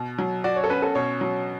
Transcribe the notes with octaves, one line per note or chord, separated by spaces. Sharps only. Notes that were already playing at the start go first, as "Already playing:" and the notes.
Already playing: B2
F#3
F#4 D5
C#5
A4
C#4 B4
A4
B2 C#5
F#3